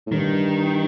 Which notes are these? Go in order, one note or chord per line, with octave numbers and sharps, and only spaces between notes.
A2
G2 D#3